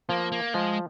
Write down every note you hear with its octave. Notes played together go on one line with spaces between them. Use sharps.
F3 A#3
A#3
F3 G#3